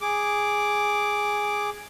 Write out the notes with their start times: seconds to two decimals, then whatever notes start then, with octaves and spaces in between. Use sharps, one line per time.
0.01 G#4 D6